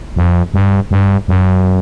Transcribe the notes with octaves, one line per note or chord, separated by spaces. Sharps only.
F2
G2
G2
F#2